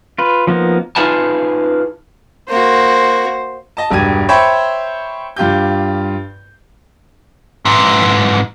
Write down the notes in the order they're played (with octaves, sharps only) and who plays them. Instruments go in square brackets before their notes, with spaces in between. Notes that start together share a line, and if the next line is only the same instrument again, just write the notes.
[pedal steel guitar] F4 B4
F3 A#3 B3 D#4
[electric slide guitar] D#4 F4 G#4 B4 G#5 A5
[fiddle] A#3 F#4 [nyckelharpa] C5
[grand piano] D#5 A5
E1 G2 G4 G#6 D#7
C5 C#5 E5 G5 B5 C#6
G2 F4 G4 G6
[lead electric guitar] G#2 E3